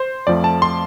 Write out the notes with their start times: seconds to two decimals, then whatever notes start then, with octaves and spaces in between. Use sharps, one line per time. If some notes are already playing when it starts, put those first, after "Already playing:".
Already playing: C5
0.27 F2 F3 A3 D5
0.44 A5
0.62 C6